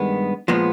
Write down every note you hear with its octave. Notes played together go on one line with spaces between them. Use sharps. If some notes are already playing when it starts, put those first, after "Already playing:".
Already playing: G2 D#3 G#3 B3
A#2 F3 G#3 B3